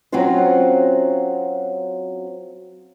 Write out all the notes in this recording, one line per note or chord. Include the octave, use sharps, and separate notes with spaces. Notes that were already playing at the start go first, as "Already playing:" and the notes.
F#3 C4 C#4 F4 F#4 C5